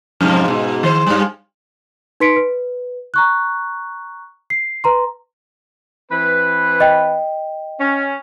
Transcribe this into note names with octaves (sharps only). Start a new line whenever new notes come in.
F2 G#2 C3
G#2 B2
D#3 C5
G2 G3
D#4 B4 C6 B6 C#7 D7
B4
A#5 C#6 F#6
C7
B4 A#5 C6
E3 C4 B4
D#5 G5
C#4